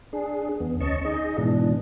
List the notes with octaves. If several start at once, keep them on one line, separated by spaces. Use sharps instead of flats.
D4 G#4
E2 B3
D2 C#4 D#5 A5 C#6
D#4 G#4 D#5
G#2 B2 E3 D4